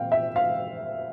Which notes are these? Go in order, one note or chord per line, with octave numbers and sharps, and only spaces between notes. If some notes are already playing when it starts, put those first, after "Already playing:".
Already playing: A#2 F3 C4 F5 G5
E5
F5